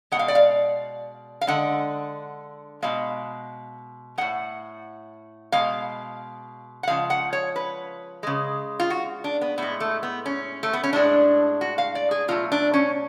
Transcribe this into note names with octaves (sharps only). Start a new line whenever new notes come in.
B2 G#3 F#5
F5
D5
F5
F5
D3 G#3 F#5
B2 G#3 F5
A2 G#3 F#5
B2 G#3 F5
F#5
C#3 F3 G#3 F5
F#5
C#5
B4
C#3 G#3
F4
F#4
D4
B3
A2 G#3 B3
A3
B3
C#4
A3
B3
C#4
A2 G#3 D4
F#4
F5
D5
G#4
B2 F#3 A3 F4
D4
C#4